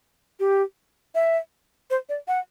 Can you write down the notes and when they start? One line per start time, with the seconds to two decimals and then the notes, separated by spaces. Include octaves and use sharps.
0.40 G4
1.15 E5
1.90 C5
2.09 D5
2.28 F#5